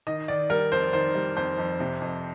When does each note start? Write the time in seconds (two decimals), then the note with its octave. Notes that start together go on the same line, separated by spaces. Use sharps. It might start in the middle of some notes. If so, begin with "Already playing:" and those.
0.07 D#3 D#5
0.28 D#3 D5
0.50 G3 A#4
0.72 F2 C5
0.93 D#3 C5
1.15 G3
1.36 F2 C5
1.58 F2
1.80 C3
2.02 F2